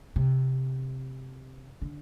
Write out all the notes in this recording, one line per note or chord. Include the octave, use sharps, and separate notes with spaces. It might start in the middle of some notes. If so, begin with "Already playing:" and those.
C3
D3